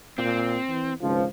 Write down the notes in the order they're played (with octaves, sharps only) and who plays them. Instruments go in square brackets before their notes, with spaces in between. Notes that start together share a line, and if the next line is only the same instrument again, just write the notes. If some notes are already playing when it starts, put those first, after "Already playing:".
[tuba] A#2 [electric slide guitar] C4
[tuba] E3
[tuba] G#1 [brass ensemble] C#2 F3